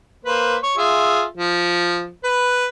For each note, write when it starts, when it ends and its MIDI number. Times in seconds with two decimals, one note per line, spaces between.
0.25 0.57 58
0.25 0.57 71
0.25 0.57 72
0.63 0.72 73
0.77 1.23 65
0.77 1.23 68
0.77 1.23 76
1.38 2.07 53
2.24 2.67 71